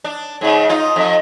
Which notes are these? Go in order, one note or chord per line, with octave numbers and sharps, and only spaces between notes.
D4
G#2 C#3
D#4 F4
F2